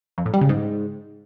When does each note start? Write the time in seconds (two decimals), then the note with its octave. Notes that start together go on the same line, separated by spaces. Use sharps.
0.18 F2
0.26 A2
0.33 G3
0.41 C#3
0.49 G#2